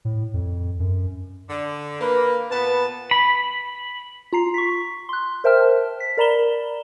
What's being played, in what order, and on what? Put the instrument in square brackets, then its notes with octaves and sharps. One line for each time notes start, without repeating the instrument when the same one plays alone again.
[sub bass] A2
F2
F#2
[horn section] D3
[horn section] A#3 [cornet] B4
[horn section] A#2 B3 A5 [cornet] B4
[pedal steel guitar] B5
[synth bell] F4 A#5 C7
C#6 B6
C6 F#6
A#4 C5 E5 G5 A5 F6
B6
A#4 D5 A#5 B5 E7 G7